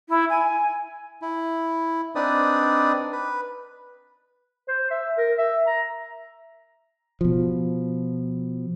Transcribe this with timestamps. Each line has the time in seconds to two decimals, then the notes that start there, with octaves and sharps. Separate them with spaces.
0.09 E4
0.29 G#5
1.22 E4
2.15 C4 D4 D#4 B4 D5 D#6
3.13 B4
4.68 C5
4.91 E5
5.18 A#4
5.38 E5
5.67 A#5
7.21 B2 F3